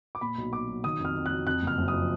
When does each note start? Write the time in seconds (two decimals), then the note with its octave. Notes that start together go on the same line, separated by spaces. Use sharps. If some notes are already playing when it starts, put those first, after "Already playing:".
0.15 D6
0.21 A#2 B5
0.38 B1
0.52 B1 D6
0.68 F#3
0.84 D#3 D#6
1.00 F2
1.05 F6
1.15 F2
1.26 F#6
1.31 F#3
1.46 F2 F#6
1.62 F#1
1.67 F6
1.78 F#1
1.88 D#6
1.93 F3